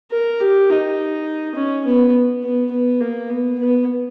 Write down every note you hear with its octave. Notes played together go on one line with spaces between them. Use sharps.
A#4
G4
D#4
C#4
B3
B3
B3
A#3
B3
B3